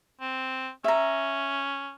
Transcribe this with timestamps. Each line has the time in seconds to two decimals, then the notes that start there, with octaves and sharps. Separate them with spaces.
0.21 C4
0.84 C#4 E5 A#5